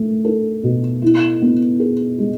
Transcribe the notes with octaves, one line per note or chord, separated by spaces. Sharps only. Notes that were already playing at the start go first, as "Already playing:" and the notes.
Already playing: A3
A4
B2
E4
B3
G#4
G#3